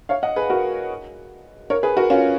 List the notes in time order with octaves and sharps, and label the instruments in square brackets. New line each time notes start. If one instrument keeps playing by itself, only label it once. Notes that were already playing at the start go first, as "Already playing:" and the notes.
[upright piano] C#5 F5
D#5 F#5
G#4 B4
F#4 A#4
A#4 C#5
G#4 B4
F#4 A#4
C#4 F4